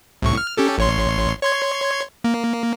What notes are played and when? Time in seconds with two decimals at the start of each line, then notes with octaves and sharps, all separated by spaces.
0.22 C2 A2 C#6
0.37 F6
0.57 C#4 G4 A4
0.78 A1 C#5 C6
1.42 C#5 C6 G#6
2.24 A#3